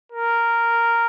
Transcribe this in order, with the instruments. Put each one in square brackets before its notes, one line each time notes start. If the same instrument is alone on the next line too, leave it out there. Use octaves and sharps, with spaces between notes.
[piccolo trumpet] A#4